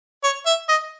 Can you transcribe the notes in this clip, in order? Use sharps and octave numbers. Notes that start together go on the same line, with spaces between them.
C#5
E5
D#5